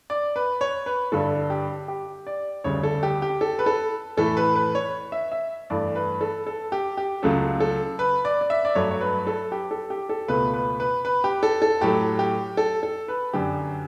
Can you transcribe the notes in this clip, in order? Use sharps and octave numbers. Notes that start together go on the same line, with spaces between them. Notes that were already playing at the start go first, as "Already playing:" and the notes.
D5
B4
C#5
B4
G2 D3 G3 A4
G4
G4
D5
D2 C#3 G3 C#5
A4
G4
G4
A4
B4
A4
A2 E3 A3 A4
B4
B4
C#5
E5
E5
G2 E3 A3 D5
B4
A4
A4
G4
G4
C#2 C#3 F#3 A3 A4
A4
B4
D5
D5
E5
D5
G2 F#3 A3 C#5
C#5
B4
A4
G4
A4
G4
A4
C#2 B2 A3 B4
B4
B4
B4
G4
A4
A4
A2 F#3 A3 G4
G4
A4
A4
B4
F#2 D3 F#3 G4